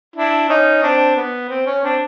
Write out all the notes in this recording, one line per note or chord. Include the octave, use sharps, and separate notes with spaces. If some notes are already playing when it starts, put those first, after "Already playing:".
D4 E4
C#4 D#4
C4 D4
B3
C4
C#4
C4 D4